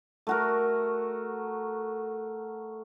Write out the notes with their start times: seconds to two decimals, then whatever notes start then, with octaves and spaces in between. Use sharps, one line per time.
0.27 A3 F#4 A#4